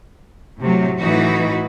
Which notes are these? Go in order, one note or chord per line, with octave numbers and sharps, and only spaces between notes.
A2 C3 F#3
A2 E3 D#4 F#4 B4